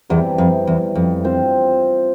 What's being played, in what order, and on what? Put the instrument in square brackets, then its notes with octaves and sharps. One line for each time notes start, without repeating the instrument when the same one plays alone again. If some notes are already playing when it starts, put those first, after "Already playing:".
[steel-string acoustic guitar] E2 [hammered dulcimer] C3 E3 G3
[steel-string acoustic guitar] F2
E2
F2
[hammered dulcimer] C4 F4 C5